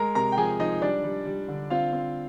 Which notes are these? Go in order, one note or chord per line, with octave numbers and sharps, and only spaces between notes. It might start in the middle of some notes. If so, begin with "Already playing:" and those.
Already playing: G#3 A#4 A#5
C3 A#4 A#5
G5
F3 G#4 G#5
F3 D#4 D#5
G3 D4 D5
G3
G3
D3
C4 F4 F5
C4